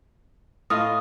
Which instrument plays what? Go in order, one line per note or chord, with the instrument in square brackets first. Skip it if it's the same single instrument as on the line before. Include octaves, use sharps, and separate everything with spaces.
[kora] A2 F4 D#5 [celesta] D#6